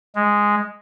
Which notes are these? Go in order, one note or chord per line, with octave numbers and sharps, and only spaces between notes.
G#3